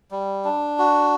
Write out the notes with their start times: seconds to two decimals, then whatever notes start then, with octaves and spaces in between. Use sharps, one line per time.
0.11 G3
0.45 D4
0.79 F#4